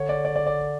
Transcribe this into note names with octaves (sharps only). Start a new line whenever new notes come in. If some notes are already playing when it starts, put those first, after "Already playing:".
Already playing: D3 C#5
D5
D5
D5
D5